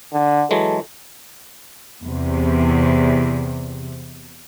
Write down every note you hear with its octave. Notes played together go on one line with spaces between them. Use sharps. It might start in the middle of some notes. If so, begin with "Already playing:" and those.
D3
E3 F#3 G#3 A4
E2 C3